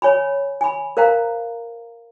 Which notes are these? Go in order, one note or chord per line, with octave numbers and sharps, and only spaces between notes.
C#5 G#5 B5
G#5 B5
A#4 C5 F5 G5 A#5